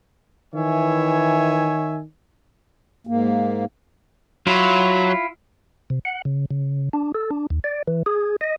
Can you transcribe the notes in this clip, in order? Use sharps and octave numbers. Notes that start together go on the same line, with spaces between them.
D#3 E3 C#5 E5 G#5
G#2 A#3
F#3 E4 F4
C3
F#5
C#3
C#3
D4
A4
D4
D#2
D5
E3
G#4
D#5